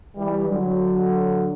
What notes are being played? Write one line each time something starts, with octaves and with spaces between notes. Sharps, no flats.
E3 G3
D3 F#3